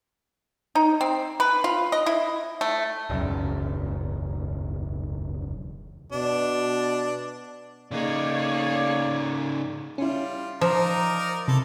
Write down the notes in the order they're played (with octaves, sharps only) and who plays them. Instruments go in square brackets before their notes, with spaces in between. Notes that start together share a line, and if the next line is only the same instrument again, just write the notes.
[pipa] D#4
C4
B4
F4
D#5
E4
A3
[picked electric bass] E1 C#2 F#2
[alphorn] B2 [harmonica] D4
[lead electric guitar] C#3 D#4 [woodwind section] A#3 [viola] G#4 C#5 [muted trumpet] D5
[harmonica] G3 F4 [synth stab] C#4 E4
[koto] F3 [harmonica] D#4 A#4 D5
[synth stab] C3 [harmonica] E4 A4